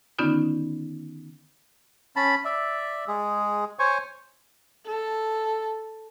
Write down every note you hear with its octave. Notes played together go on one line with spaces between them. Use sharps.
D3 D#3 B3 C#4 D#4 F4
C#4 A5 B5
D5 E5
G#3 G#4
C5 C#5 G#5 C#6
A4